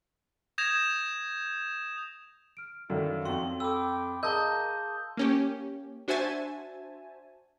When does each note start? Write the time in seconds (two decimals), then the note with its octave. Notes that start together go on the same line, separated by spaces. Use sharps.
0.58 D#6 G6 G#6 A#6 E7 F7
2.57 F6 D7
2.90 F#2 D#3 E4 A4 D5 F5
3.25 F2 F#4 G5 C6
3.60 A4 G5 B5 D6 E6
4.23 G#4 A#4 D#5 F5 A5 D#6 G6 G7
5.17 A#3 C#4 G4
6.08 D4 F#4 C5 E5 G#5 A5